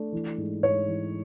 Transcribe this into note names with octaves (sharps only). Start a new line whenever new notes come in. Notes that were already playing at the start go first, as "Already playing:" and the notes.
Already playing: A3 D4
E3
G#2
G#2 C#5
E3